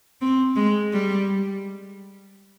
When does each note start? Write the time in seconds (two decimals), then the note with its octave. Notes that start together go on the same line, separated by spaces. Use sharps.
0.21 C4
0.56 G#3
0.93 G3